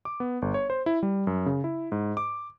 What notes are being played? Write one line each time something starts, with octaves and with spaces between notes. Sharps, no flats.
D6
B3
G1
C#5
C5
E4
G3
F#2
C#3
E4
G#2
D6